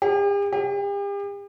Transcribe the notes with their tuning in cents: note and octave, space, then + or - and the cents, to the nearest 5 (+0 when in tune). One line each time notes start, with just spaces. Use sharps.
G4 +45
G4 +40